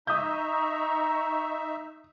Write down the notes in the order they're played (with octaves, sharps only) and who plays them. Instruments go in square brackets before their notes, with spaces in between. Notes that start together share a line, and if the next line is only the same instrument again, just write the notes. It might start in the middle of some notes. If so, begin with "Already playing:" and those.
[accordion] D#4 E5 [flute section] A#5 C#6 [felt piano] D#6 G6